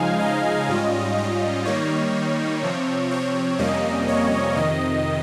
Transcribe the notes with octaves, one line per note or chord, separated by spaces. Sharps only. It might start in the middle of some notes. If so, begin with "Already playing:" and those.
Already playing: C#3 F3 G#3 D#4 F5 G#5
D#5
G#2 G3 C#4 F4
D#5
D#3 G3 A#3 D#4 C#5
C3 F3 C4
C#5
F2 C3 G3 A#3 C#4 D#5
C#5
F2 C3 D#3 D#5